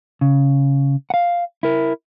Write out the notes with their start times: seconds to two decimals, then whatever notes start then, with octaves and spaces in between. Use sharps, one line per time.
0.21 C#3
1.10 F5 F#5
1.63 E4 A#4